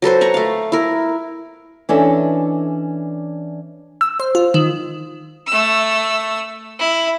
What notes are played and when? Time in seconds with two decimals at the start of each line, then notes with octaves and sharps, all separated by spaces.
0.02 F#3 A4 B4 C5
0.21 F#5 A#5 C#6
0.34 A3 F5
0.72 E4 A#4
1.89 E3 C#4 D4 A4 D#5 E5
4.01 E6
4.20 C5
4.35 F4
4.54 D#3
5.47 A3 E6
6.79 E4